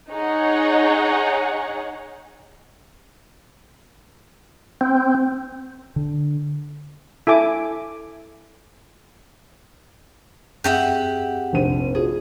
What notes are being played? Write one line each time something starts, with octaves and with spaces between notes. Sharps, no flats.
D#4 G#4 C#5 F#5
C4
D3
E4 A4 G#5 D6
F#2 C4 G4 G#4 E5 F#5
F1 A#1 D#7
F4 F#4 G#4